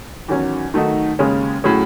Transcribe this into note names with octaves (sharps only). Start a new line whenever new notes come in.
E2 D#3 F#3 C#4
D#3 F#3 A3 D#4 F#4
D#2 C#3 G#3 C#4
A2 F#3 C#4 G#4